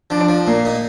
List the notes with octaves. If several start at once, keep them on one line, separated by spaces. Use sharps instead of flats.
F3 D4
F3
A#2 A#3
D#4